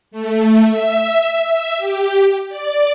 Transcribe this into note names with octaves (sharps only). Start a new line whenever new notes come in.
A3
E5
E5
G4
D5